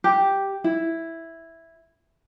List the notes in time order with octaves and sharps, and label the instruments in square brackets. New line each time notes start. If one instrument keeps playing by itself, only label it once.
[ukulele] G4
E4